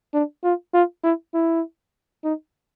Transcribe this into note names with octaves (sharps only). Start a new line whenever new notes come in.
D4
F4
F4
E4
E4
D#4